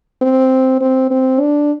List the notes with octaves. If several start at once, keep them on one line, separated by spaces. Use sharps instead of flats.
C4
C4
C4
D4